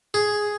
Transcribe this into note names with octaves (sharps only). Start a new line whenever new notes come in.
G#4